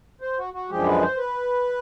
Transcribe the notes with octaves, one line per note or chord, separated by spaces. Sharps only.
C5
F#4
F#4
F#2 D3 F3 G#3 G4
B4
C5
B4